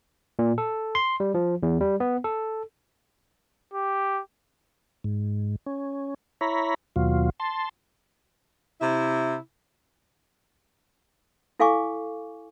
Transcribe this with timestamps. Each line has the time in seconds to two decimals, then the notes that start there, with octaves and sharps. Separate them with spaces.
0.39 A#2
0.58 A4
0.95 C6
1.20 G3
1.34 F3
1.63 E2
1.81 G3
2.00 B3
2.24 A4
3.73 G4
5.04 G#2
5.66 C#4
6.41 E4 C#5 A#5 B5
6.96 D#2 B2 F#3 F4
7.40 A5 C6
8.80 C3 E4
11.59 E4 A4 F5 G#5 C#6 D6